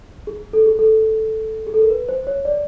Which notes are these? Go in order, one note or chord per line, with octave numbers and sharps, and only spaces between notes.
G#4
A4
G#4
A4
G#4
A4
A#4
B4
C5
C#5
D5